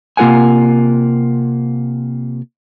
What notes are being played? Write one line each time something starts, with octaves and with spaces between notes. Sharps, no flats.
C3 A#3 F4 A#4 F#5 G#5